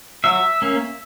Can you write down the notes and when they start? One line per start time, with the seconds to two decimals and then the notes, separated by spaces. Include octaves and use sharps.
0.24 F#3 E5
0.62 A#3 C#4